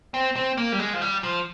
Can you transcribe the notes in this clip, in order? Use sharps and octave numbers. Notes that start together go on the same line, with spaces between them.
C4
C4
A#3
G3
G#3
F3
G3
F3